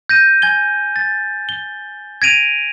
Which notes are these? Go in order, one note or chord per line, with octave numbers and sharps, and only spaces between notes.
G6 A#6 D#7
G#5 G#6 G7
A6
G7
G#6 A#6 D7 D#7 F7